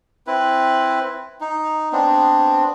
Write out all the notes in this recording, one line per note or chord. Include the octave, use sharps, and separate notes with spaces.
C4 E4 B4
D#4
B3 C4 D4